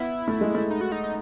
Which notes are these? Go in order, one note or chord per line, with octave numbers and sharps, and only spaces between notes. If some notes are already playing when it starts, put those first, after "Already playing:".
Already playing: B3 E4
A3
G#3
A3
D#4
F#4
D#4
D#4